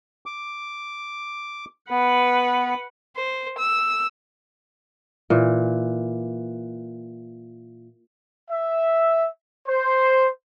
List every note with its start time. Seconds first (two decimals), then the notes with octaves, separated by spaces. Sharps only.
0.26 D6
1.90 B3 B4 F#5
3.16 C5
3.57 E6
5.30 A#2 E3
8.50 E5
9.68 C5